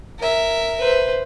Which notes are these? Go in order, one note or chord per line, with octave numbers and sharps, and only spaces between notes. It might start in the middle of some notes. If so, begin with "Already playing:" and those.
A#4 E5
B4 C5